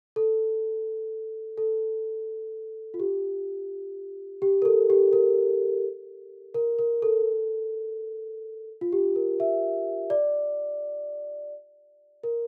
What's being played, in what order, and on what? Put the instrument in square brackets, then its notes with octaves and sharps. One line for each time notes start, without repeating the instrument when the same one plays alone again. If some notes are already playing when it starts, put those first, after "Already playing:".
[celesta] A4
A4
F4
G4
G4
A#4
A4
G4
A#4
A#4
A#4
A4
F4
G4
A#4
E5
D5
A#4